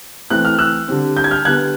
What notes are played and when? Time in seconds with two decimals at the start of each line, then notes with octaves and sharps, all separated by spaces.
0.30 E3 A3 C4 F#6
0.45 F6
0.59 E6 F#6
0.88 D3 G3 C4
1.17 G6
1.24 G#6
1.31 F6 G6
1.45 D3 G3 B3 F#6 G#6